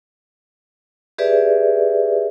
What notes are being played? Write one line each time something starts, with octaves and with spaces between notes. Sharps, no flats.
G4 G#4 B4 D5 E5